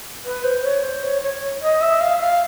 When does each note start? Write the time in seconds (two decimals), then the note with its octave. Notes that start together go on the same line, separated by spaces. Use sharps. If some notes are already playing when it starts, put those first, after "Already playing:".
0.24 B4
0.44 C5
0.63 C#5
0.83 C5
1.03 C#5
1.22 C#5
1.61 D#5
1.81 E5
2.01 F5
2.20 F5